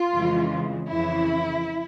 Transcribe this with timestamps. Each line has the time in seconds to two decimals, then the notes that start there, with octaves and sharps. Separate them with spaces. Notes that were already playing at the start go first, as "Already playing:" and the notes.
Already playing: F4
0.11 F2 C#3 E3 G#3
0.86 F2 C#3 E3 E4